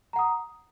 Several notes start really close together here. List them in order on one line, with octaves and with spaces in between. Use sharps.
A#5 F#5 D#6